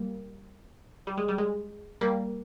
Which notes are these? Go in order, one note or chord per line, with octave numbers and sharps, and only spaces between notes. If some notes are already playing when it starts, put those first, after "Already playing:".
Already playing: G3 A#3
G3
G#3
G3
G#3
G3 A#3